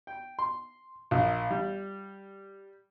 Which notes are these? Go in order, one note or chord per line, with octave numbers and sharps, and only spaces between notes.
G5
C6
A#1
G3